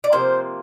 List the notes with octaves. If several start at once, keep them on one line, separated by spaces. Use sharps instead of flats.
D5
C3 F3 A#3 C5